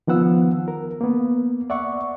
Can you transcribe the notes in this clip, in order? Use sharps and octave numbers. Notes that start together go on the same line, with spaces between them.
D#3 F3 B3 F#5 E6
A#4
A#3 B3
D5 E5 F#5 C#6